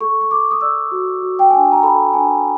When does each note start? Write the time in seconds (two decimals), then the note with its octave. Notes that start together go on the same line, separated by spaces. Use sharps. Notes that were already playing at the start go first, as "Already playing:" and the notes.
0.01 A4 C#6
0.21 C#6
0.31 A4 D6
0.51 D#6
0.61 D5 E6
0.91 F#4
1.22 F#4
1.39 G5
1.50 D4 G#5
1.61 A5
1.72 A#5
1.82 A4 B5
2.13 D4 G#5